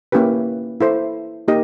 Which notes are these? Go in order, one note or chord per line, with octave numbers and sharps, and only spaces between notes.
A#3 C#4 E4 G4 B4
E4 A4 C5
A#3 D#4 G4 A#4 D#5